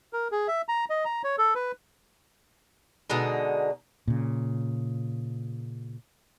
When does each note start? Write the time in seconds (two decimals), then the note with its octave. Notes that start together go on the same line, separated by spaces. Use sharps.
0.13 A#4
0.32 G#4
0.48 E5
0.68 A#5
0.90 D#5
1.05 A#5
1.24 C#5
1.38 A4
1.55 B4
3.10 B2 D3 G#3 D#4
4.08 A#2 C#3